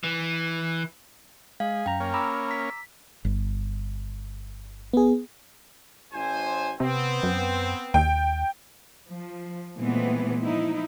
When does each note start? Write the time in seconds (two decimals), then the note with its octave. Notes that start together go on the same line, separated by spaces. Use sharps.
0.03 E3
1.60 G#3 G#4 F5
1.86 F#2 G5 A#5
2.00 A#3 C#4
2.14 A#5 B5 D6 E6
2.51 B6
3.25 G1
4.94 B3 G#4
6.13 A1 C5 G#5
6.80 C3 B3 C4
7.23 F#2
7.94 D#2 G5
9.07 F3
9.78 A#2 E3 G#3 A3 B3 C4
10.42 F3 D#4 E4